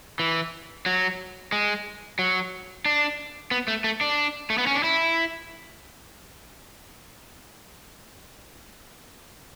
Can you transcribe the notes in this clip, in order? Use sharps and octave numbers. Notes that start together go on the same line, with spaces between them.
E3
F#3
G#3
F#3
D4
B3
A3
A3
D4
A3
B3
C#4
D4
E4